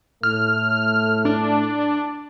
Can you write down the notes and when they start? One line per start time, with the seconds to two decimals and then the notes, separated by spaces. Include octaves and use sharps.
0.23 A2 A3 F6
1.25 D4